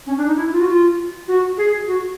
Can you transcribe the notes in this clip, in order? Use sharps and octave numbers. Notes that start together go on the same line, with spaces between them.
C#4
D4
D#4
E4
F4
F#4
F4
F#4
G#4
F#4